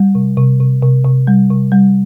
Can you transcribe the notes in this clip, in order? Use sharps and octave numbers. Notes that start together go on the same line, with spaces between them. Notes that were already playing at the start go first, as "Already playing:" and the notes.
Already playing: G3
C3
C3
C3
C3
C3
G3
C3
G3